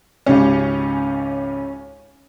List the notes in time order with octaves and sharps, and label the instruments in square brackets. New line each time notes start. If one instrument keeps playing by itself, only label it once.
[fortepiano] G#1 C#2 G4 [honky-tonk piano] C#4